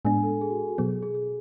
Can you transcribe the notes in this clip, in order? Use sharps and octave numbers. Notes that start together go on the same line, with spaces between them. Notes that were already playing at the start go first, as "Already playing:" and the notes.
A2 G#3 B3 D4 G#5
A4
G#4
F#4
G#4
F#4
B2 F#3 B3 G#4
G#4
G#4
G#4